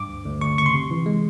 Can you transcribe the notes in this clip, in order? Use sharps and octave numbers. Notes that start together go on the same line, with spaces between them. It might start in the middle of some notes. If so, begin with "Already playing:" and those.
Already playing: G2 D6
D2
D2
D2 C#6
C#3 C#6
C6
C3
E3
G#3